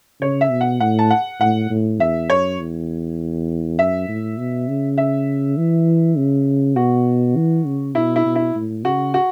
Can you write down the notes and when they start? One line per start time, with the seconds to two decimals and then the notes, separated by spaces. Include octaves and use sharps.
0.21 C#3 C#5
0.41 E5
0.51 B2
0.61 F#5
0.80 A2 F#5
0.99 A5
1.11 F#5
1.40 A2 F#5
1.70 A2
2.00 E2 E5
2.30 F#2 C#5
2.59 E2
3.79 F#2 E5
4.08 A2
4.38 B2
4.68 C#3
4.98 E5
5.57 E3
6.17 C#3
6.76 B2 F#4
7.36 E3
7.66 C#3
7.95 B2 E4
8.16 E4
8.26 B2
8.35 E4
8.55 A2
8.85 C#3 F#4
9.14 F#4